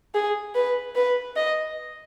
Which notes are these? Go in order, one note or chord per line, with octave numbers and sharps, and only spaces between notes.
G#4
B4
B4
D#5